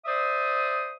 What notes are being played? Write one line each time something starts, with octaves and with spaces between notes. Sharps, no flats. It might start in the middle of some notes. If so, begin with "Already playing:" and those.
C5 D5 E5 D#6